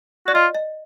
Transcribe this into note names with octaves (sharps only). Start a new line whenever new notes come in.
F#4 D5
F4 D#5
D#5